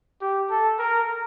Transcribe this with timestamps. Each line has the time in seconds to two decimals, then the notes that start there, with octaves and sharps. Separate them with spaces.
0.21 G4
0.50 A4
0.79 A#4